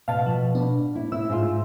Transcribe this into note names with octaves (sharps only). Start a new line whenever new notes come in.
B2 F5 A5
F3
B3 D4
E4
E4 E6
G#2 F4